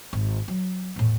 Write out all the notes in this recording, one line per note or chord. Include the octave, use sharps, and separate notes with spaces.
G#1
F#3
E2 A2